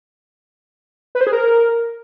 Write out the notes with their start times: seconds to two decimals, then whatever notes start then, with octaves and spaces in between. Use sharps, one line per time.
1.15 B4
1.21 C5
1.27 G#4
1.33 A#4